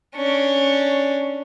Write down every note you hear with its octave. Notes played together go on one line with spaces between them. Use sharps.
C#4 D4